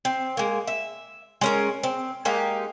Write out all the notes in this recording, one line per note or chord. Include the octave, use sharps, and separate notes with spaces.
C4
G#3 A#3
E5
G#3 C#4 A#4
C4
G#3 A#3 D#4 G4